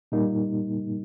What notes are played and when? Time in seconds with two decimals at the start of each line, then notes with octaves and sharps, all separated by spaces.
0.12 A#2 G3 A#3 D#4